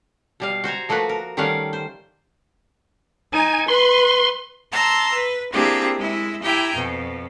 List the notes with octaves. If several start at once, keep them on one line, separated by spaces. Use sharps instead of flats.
B2 G3 F5
F#4 C5 G#5 A#5
F3 A3 A#3 F#4 B4
A#4
D#3 G3 A3 C#4 F5 F#5
C5
D#4 G#5
B4 C6
A5 A#5 C6 E6
B4
A#3 C4 D4 E4 G4 G#4
G#3 E4
E4 G4 G5 G#5 A#5
F2 B2